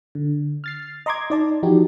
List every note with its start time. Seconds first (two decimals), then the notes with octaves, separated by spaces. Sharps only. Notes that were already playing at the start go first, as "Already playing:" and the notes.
0.15 D3
0.64 F6 A6 C7
1.06 D#5 A#5 C6 D6 G#6
1.30 D#4 D5 A5
1.63 E3 F3 D#4 F#4 G4